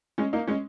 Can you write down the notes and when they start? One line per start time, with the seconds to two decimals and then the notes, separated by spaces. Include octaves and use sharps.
0.18 G#3 C#4
0.33 A#3 D#4
0.47 G#3 C#4